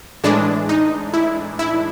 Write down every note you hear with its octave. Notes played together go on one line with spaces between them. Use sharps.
A2 E3 G#3 D4
D#4
E4
E4